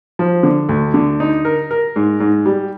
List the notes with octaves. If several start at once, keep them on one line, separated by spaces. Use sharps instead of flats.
F3
D3
D2
D3
D#4
A#4
A#4
G#2
G#2
G3